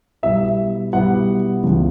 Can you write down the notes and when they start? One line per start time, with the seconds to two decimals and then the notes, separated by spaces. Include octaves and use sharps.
0.23 B2 G3 B3 E4 E5
0.93 B2 G3 B3 E4 F#5
1.63 C#2 C#3 E3 B3